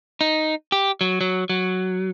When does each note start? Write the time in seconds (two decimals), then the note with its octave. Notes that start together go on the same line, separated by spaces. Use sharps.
0.21 D#4
0.72 G4
1.01 F#3
1.21 F#3
1.49 F#3